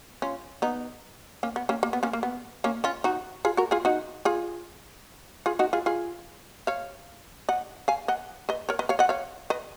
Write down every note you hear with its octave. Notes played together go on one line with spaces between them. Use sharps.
C#4 F4
B3 D#4
A#3 C#4
B3
A#3 C#4
A#3
B3
A#3 C#4
A#3
B3
A#3 C#4
C#4 F4
D#4 F#4
F4 G#4
F#4 A#4
F4 G#4
D#4 F#4
F4 G#4
F4 G#4
D#4 F#4
F4 G#4
F4 G#4
C#5 F5
D#5 F#5
F5 G#5
D#5 F#5
B4 D#5
A#4 C#5
B4 D#5
C#5 F5
D#5 F#5
C#5 F5
B4 D#5